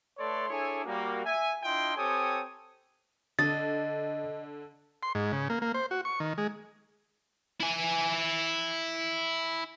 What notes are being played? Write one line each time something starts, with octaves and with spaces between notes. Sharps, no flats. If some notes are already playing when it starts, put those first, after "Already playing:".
A3 A4 B4 C#5 D5 C6
D4 E4 G#4 A4 C#5 G#5
G3 A#3 F#4
E5 G#5
D4 E4 F4 D#5 G5 C6
C4 G4 A4 C#5 G#5 D#6
D3 D#5 A6
C6
G#2
C#3
A#3
A#3
C5
F#4
C#6
D#3
G#3
E4 G#5